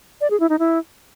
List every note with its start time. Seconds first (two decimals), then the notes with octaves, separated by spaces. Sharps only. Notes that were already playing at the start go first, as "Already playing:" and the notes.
0.21 D5
0.30 G#4
0.40 E4
0.50 D#4
0.59 E4